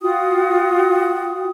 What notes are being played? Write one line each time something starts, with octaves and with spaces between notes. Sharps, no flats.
F4 F#4 G5 D#6